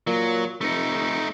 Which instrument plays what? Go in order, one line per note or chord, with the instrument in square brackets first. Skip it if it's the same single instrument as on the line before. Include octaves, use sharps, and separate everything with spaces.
[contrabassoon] A#2 [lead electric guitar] F#3
[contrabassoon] F1 [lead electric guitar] A3 D#4